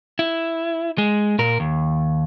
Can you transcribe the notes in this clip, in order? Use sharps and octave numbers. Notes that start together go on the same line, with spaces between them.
E4
G#3
A#2 A#4
D#2